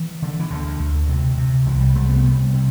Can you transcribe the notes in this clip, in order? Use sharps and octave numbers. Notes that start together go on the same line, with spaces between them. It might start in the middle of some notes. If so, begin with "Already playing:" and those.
Already playing: E3
D3
E3
D2 D3
D2
C3
C3
C2 E3
G3
C2 A3
B3
C3 G3
C3